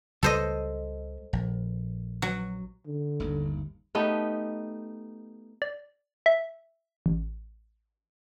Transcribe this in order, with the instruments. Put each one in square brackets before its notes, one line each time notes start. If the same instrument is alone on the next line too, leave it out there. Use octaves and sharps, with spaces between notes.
[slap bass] C#2 G3 [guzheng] A4 C5 D#5
[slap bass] A#1
[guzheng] F#3
[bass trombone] D3
[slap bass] G1 D#2
[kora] A3 B3 D#4 G4
[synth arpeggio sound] D5
E5
A1